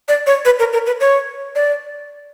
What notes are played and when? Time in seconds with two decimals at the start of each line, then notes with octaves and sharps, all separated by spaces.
0.08 D5
0.27 C#5
0.45 B4
0.59 A#4
0.73 A#4
0.86 B4
1.00 C#5
1.55 D5